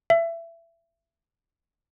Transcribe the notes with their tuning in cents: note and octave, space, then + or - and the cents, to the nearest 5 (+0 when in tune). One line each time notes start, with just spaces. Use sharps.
E5 +25